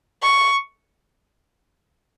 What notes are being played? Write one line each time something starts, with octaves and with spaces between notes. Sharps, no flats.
C#6